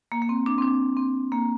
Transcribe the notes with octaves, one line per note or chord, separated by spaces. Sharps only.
A#3
A#3
C4
D4
C4
D4
C4
A#3